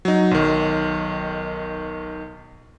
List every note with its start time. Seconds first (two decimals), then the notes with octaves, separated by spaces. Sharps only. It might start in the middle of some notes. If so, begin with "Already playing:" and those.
0.05 F#3 D#4
0.31 B1 D#3